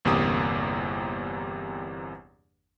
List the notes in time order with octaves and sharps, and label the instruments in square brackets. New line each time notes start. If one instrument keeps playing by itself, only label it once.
[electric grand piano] G1 E2 C3 A#3 G4 D#6